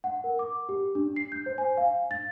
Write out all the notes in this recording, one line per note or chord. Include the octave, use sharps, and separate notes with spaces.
F#5
A#4
D6
G4
D4
C7
G6
C5
G#5
F5
A6